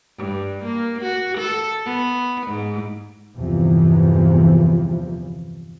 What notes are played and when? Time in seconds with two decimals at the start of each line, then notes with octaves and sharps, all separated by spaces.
0.17 G2
0.64 A#3
1.02 F#4
1.38 A4
1.86 B3
2.47 G#2
3.36 G1 E2 C3 E3 F3